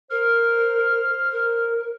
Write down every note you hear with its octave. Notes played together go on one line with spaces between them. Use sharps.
A#4 C5 F6
A#4